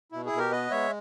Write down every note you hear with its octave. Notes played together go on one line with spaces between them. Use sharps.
B2 E4
E4 G#4
B2
G4 A#4
B3 B4 D#5
G#3 C#5 E5